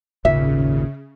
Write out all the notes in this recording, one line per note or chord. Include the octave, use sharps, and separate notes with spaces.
G#1 D#2 A#2 C#3 E5